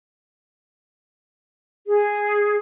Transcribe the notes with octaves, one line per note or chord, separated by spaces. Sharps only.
G#4